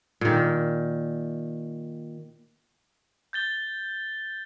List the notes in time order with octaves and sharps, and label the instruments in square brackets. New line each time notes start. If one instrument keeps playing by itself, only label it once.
[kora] A#2 D#3
[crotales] G6 A6 G7